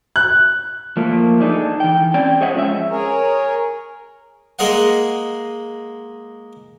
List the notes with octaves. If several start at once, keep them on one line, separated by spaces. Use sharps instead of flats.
F#6
F3 A3 A#3
D4 D#4 G#4 A4
E3 G5
C4 C#4 D5 G5
G#4 C5 C#5 D#5 E5 F#5
F3 G#3 C#4 E4 E5
G#4 A#4 C#5
G#3 A#3 G#4 D#5 F5 F#5